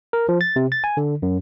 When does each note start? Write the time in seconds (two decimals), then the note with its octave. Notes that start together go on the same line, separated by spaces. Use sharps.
0.13 A#4
0.29 F3
0.41 A6
0.56 C3
0.72 A6
0.84 G#5
0.97 D3
1.22 F#2